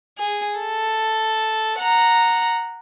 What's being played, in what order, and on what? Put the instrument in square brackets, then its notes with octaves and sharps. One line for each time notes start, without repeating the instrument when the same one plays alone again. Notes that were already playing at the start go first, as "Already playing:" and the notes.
[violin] G#4
A4
F#5 A#5